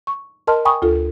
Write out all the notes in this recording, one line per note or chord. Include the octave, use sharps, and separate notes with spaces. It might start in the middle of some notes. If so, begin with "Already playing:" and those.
C#6
A#4 D#5 A5 C6 F6
G5 G#5 B5 C#6 D#6
D2 F4 A4